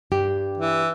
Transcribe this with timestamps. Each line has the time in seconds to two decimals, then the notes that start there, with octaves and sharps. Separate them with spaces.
0.12 G2 G4
0.58 E3